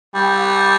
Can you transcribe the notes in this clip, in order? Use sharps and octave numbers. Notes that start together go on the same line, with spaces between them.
G3